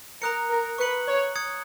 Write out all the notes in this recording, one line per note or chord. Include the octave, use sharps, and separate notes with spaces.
A#4 A#5 D#6 F#6 C#7
A#4
B4 C#6 F#6 C#7 F#7
C#5
D#6 G#6 C#7